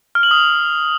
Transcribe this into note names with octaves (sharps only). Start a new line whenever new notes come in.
F6
F#7
D#6